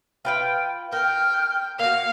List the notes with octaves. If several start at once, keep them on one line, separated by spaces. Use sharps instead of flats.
F4 B4 F5 G5
A#4 G5 F6
A#3 F#4 F5 F7